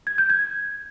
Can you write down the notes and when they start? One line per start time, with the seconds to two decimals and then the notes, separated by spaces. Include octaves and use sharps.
0.07 G#6
0.18 G6
0.30 G#6